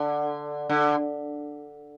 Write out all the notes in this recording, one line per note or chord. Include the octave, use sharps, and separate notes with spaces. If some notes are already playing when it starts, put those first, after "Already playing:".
Already playing: D3
D3